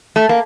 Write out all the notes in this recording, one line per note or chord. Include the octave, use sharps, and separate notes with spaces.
A3
A#3